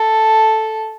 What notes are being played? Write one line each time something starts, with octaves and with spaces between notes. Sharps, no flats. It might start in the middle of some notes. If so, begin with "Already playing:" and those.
Already playing: A4